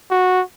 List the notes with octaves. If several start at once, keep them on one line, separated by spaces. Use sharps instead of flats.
F#4